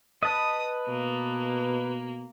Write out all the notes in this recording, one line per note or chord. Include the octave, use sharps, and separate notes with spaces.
B4 D#5 A5 D#6
B2 A#3